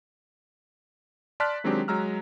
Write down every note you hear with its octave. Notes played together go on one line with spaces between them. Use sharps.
D5 A5 C6 F6 F#6 B6
D#3 F#3 G#3 C4 D4 G4
F#3 G#3 A#5 E6 F6